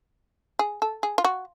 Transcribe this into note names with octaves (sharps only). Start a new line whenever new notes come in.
G#4
A4
G#4
F4
F#4